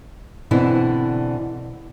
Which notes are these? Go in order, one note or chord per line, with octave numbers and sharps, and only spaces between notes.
B2 D3 E3 C4 D4 E4